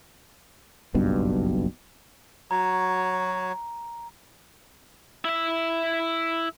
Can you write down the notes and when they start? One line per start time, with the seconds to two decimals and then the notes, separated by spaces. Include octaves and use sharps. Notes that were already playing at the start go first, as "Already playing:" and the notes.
0.95 F#1 B1 G2 B2
2.51 F#3 F#4 C#5 A#5
5.25 E4 E5